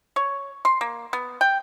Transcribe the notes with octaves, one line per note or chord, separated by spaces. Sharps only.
C#5
C6
A#3
B3
G5